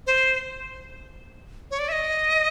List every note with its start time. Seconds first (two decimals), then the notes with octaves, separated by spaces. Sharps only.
0.07 C5
1.71 C#5
1.79 D5
1.89 E5
1.92 D#5